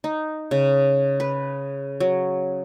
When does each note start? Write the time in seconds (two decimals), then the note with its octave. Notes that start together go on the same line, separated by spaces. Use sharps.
0.04 D#4
0.51 C#3
1.20 B4
2.00 F#3